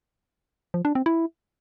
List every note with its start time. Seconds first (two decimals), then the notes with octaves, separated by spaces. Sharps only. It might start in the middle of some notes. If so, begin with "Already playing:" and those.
0.74 F3
0.85 D4
0.95 C4
1.06 E4